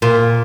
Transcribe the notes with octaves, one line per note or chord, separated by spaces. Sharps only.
A#2